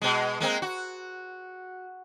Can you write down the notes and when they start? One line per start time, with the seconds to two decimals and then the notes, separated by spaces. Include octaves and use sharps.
0.02 B2 G#3
0.40 G#3 A#3 C4
0.62 F#4